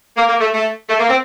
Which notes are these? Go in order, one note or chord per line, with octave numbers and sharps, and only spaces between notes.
A#3
A#3
A3
A3
A3
A#3
C4